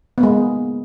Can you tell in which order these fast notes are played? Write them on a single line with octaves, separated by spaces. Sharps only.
B3 A#3 G#3